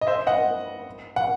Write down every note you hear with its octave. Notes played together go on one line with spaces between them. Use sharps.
D#5
C5 E5
D#5 F#5
F#5